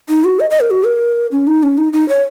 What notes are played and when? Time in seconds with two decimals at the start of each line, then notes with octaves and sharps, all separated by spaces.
0.09 D#4
0.25 F#4
0.40 D#5
0.50 D#5
0.60 A#4
0.71 F#4
0.85 A#4
1.32 C#4
1.47 D#4
1.63 C#4
1.78 D#4
1.93 D#4
2.09 C#5